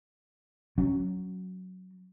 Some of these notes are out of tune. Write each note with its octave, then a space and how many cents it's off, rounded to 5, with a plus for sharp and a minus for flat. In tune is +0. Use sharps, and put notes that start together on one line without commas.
F#3 +0 C#4 +0